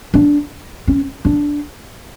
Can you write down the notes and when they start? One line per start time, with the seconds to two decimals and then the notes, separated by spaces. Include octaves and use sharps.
0.14 D4
0.88 C#4
1.25 D4